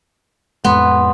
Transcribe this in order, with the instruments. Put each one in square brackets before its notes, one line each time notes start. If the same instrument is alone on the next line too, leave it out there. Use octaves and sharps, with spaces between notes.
[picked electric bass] F2 A2 G#3 [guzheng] B3 [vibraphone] C6